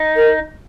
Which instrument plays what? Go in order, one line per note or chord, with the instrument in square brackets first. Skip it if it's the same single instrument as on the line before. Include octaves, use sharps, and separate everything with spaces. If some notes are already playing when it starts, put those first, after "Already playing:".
Already playing: [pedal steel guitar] D#4
[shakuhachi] A#4